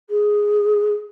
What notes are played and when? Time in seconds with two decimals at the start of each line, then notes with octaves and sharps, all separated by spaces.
0.10 G#4